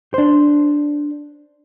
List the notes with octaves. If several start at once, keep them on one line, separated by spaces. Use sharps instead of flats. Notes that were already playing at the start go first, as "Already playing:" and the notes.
D4 C5